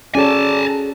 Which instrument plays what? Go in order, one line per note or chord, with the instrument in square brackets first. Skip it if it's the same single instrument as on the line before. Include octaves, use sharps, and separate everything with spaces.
[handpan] C#4 F#4 A4 [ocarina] G#4 [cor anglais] D5 [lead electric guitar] G#5 A5